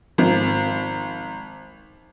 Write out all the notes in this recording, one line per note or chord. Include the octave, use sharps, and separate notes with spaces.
G#1 F3